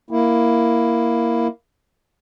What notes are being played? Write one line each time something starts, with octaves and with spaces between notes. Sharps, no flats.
A#3 E4